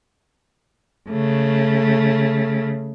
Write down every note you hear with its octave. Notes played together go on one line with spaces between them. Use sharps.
C#3 A3